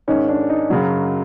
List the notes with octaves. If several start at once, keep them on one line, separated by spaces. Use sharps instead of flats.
G#2 D#3 G#3 C#4
D4
D#4
F#2 C#3 F#3